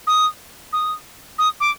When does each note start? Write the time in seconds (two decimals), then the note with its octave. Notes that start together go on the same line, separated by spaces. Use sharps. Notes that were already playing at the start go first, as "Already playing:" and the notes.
0.07 D#6
0.73 D#6
1.38 D#6
1.60 D6